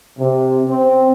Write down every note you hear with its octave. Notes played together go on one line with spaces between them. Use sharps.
C3
C4